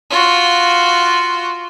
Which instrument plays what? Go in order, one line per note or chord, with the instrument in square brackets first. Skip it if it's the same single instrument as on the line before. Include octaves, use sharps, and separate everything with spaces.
[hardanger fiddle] F4 F#4